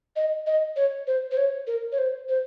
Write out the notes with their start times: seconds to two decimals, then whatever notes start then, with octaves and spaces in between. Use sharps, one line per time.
0.16 D#5
0.47 D#5
0.76 C#5
1.07 C5
1.31 C5
1.37 C#5
1.67 A#4
1.92 C#5
1.98 C5
2.28 C5